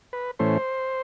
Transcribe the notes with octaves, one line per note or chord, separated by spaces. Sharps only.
B4
A2 E3 A3 C#4 C5